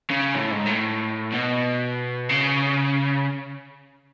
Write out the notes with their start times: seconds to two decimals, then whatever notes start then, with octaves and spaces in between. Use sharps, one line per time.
0.10 C#3
0.35 A2
0.51 G#2
0.67 A2
1.32 B2
2.29 C#3